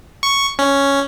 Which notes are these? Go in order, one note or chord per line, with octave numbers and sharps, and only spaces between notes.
C#6
C#4